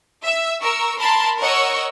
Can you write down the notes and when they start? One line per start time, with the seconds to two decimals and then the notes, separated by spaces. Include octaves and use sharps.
0.24 E5 E6
0.62 A#4 C#6 E6
1.00 A#4 A5 B5 C6
1.40 A#4 C#5 D#5 F#5 C#6 E6